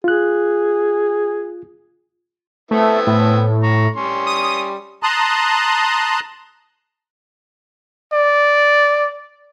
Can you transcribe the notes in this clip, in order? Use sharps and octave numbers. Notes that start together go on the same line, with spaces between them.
F4 G#4 F#6
A3 B3 C4 E4
A2
A#5 C#6
G3 C#4 C6
D#6
A5 A#5 C6 D#6 F#6
D5